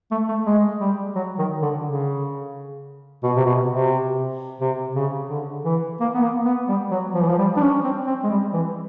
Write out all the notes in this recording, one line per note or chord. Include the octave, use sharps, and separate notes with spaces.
A3
A3
G#3
G3
F#3
D#3
D3
C#3
B2
C3
B2
C3
C3
C#3
D3
E3
A#3
B3
A#3
B3
G3
F#3
F3
E3
F3
G3
D4
C#4
C4
C4
G#3
G3
E3